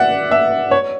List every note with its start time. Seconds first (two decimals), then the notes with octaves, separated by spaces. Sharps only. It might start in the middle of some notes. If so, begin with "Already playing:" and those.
Already playing: D5 E5 F#5
0.31 E5
0.71 C#5